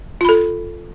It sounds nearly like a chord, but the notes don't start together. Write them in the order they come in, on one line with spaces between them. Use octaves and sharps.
F4 B5 A4